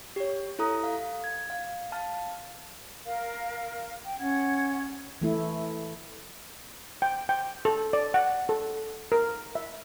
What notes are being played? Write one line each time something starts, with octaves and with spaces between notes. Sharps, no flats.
G4 C#5
E4 A4 A#5 D#6
F5
G#6
F5
F5 A5 F6
A#4 F5
G5
C#4 F#5 G#6
E3 A3 E4
G5
G5
A4
D5
F#5
A4
A#4
E5